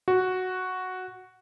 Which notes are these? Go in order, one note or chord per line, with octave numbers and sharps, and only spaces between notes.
F#4